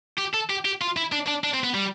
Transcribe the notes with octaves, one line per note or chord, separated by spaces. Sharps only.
G4
A4
G4
G4
F4
E4
D4
D4
D4
C4
B3
G3